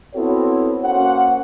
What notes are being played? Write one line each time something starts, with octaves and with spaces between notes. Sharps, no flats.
B3 C4 E4 F#4 A4 C#5
A#3 C#4 F#4 C5 F#5